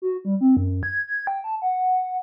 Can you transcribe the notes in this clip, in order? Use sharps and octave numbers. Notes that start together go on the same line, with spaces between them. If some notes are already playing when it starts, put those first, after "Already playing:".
F#4
G3
C4
F#2
G#6
G#6
G5
A5
F#5